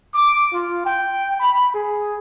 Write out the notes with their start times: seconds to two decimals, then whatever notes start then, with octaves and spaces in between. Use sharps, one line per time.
0.14 D6
0.51 F4
0.84 G5
1.40 B5
1.73 G#4